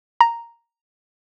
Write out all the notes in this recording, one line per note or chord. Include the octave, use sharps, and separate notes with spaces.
A#5